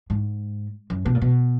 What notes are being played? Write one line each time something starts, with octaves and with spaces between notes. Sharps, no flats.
G#2
F#2
B2
A#2
B2